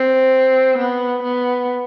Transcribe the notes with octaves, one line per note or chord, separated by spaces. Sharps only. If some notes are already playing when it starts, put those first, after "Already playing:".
Already playing: C4
B3
B3